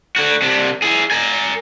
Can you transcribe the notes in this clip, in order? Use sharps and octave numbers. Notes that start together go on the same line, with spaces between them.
D3 F#4
C3 D4
E4 G#4
A#4 G#5